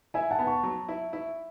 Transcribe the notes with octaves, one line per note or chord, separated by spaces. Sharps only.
E4 E5 G#5
F#5 A5
B3
A5 C#6
F#3
E4
E4